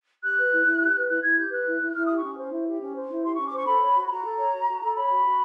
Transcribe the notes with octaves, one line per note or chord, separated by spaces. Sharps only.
G4 F#6
B4
E4
E4
G4
B4
E4 F#6
E4 G#6
G4 G6
B4 F#6
E4
E4
E4 F6
G4 D#6
C#6
C#4
C5
E4
G4
C#4
C5
E4
G4 C6
C#4 C#6
D6
C5 C#6
A4 B5
C#5
F#4
B5
F#4 A#5
A4
C#5
F#4
F#4
A4
C#5 B5
F#4
F#4